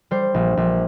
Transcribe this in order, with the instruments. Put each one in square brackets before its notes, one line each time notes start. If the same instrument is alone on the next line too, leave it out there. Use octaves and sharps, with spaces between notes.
[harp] G3 C5
A#1
A#1